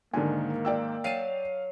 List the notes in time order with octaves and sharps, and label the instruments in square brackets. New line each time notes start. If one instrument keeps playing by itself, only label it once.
[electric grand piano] G#2 D#3 [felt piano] D3 D4 G#5 [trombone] A#3
[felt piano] D5 G5 E6
[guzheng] F#3 A5 [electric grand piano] F5 C7 D#7